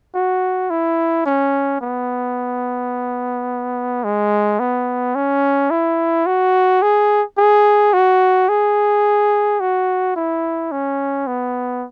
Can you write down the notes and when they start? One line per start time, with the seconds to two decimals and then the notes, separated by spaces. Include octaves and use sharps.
0.14 F#4
0.70 E4
1.26 C#4
1.81 B3
4.04 G#3
4.59 B3
5.15 C#4
5.71 E4
6.26 F#4
6.82 G#4
7.38 G#4
7.93 F#4
8.49 G#4
9.60 F#4
10.16 E4
10.72 C#4
11.27 B3